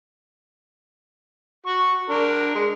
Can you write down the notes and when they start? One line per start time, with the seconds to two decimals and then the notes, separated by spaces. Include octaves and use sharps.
1.66 F#4 C#6
2.10 D4 A#4
2.55 G#3